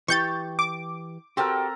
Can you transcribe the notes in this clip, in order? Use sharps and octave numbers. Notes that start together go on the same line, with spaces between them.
E3 G4 C#6 G6 A6
D6
C4 F#4 G4 A4 A#4